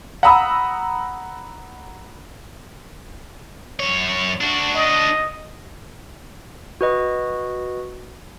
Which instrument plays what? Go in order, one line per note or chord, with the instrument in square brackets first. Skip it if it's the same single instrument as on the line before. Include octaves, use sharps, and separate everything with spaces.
[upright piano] F#5 A#5 B5 D#6 E6
[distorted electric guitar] F#2 C#5
D4 F#4
[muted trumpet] D#5
[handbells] F#4 B4 D#5